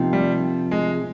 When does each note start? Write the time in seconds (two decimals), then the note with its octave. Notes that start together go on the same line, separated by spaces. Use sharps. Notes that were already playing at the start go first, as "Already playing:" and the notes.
Already playing: C3 F3 A#3 D#4
0.13 G3
0.71 G#3